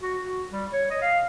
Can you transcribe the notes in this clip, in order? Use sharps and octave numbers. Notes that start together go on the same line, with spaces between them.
F#4
F#4
G3
C#5
D#5
F5